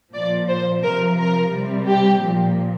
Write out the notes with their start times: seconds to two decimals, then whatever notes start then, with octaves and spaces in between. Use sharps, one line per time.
0.14 A#2 F3 D5
0.48 C5
0.83 C3 F3 A#4
1.17 A#4
1.52 C3 G3
1.87 G4
2.21 A#2 F3